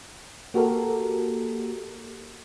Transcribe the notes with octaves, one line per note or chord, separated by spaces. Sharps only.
A#3 F#4 G4 A4 A#4